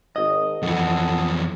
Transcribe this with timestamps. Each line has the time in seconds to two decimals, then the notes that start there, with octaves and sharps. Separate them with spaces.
0.16 G#1 D#5
0.63 F2 E3 F4 A4 F#5